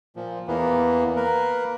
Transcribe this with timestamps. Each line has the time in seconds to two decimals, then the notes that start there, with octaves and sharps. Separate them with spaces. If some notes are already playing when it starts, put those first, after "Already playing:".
0.16 A#2 F3
0.48 E2 E3 A#3 B3
1.16 A#3 A#4 B4